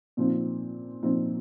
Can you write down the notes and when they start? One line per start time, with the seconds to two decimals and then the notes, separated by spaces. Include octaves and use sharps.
0.17 A#2 F3 C4 D#4
1.03 A#2 F3 C4 D#4